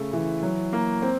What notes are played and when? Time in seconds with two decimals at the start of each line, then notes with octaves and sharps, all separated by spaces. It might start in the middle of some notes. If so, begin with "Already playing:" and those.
Already playing: C#3 A3
0.13 E3
0.43 F#3
0.73 A#3
1.02 C4